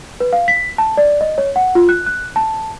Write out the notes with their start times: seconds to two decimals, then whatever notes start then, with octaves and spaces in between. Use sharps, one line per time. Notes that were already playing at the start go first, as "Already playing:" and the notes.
0.20 B4
0.33 F5
0.48 B6
0.78 A5
0.97 D5
1.21 D#5
1.38 C#5
1.56 F#5
1.75 F4
1.89 F#6
2.06 F#6
2.36 A5